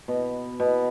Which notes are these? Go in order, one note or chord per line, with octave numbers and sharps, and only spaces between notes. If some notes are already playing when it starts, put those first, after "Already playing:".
B2
B2